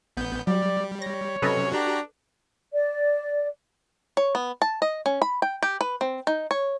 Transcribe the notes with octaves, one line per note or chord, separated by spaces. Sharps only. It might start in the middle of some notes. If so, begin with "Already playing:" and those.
A1 B3 G6
F#3 G3 D5
C#5 A#6
C3 F#3 C#4 A4 B4 D#5
D4 F#4 G4 A#5
D5
C#5
B3
A5
D#5
C#4
B5
G5
G4
B4
C4
D#4
C#5